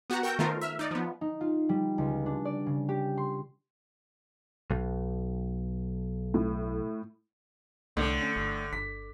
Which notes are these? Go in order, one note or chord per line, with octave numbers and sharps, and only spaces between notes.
B3 F#4 G4 F#5 A#5
A#4 G5 C#6 E6 G6 A#6
D#3 A3 B3 F4 A#4 C5
E5 F6
D#4 D5
F3 B3
D#4
F4
G3
C#2
D4
D5
C#3
G4
C6
B1
A2
C2 A2 D3 D4
C#4
G1
G1 B6